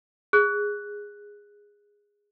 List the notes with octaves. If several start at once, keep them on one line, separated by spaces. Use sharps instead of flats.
G#4 F#6